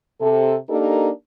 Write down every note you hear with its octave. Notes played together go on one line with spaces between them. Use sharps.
C3 A4
A#3 D4 D#4 G4 A4 A#4